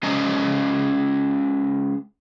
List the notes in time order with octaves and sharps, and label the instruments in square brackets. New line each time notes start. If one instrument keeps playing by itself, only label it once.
[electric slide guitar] G#3 C#4 C5 D#5 A#5